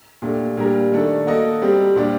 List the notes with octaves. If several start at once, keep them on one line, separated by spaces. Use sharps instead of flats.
A#2 A3 D4 G4
A#2 G3 D4 G4 A#4
D#3 A3 D4 A4
A#3 F#4 A4 D#5
G3 C4 G4
A#2 G3 D4 G4 D5